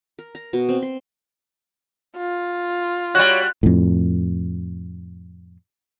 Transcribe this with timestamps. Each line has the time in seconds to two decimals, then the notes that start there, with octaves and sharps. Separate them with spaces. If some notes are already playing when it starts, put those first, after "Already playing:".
0.19 A#4
0.35 A#5
0.53 B2
0.69 C4
0.83 C6
2.17 F4
3.15 G3 F#4 C#5 F#6
3.63 F2 A2